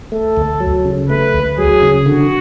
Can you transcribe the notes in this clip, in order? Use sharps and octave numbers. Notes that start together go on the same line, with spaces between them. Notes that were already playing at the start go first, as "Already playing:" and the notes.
A3 A4
D2
F#3
C#3
A3 B4
D2
F#3 G#4
C#3
D3 F#4